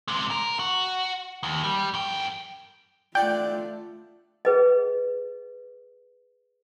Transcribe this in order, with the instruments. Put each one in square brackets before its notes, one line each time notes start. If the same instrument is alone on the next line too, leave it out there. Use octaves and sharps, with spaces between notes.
[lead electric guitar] C3 G#3
A#4
F#4
D#2
G3
F#2 G5
[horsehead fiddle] A3 F4 [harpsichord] D4 D5 F#5 [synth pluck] G5
[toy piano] G#4 B4 D#5